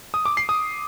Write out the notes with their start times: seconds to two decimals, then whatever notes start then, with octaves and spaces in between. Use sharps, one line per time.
0.14 D#6
0.25 D6
0.37 C7
0.49 D#6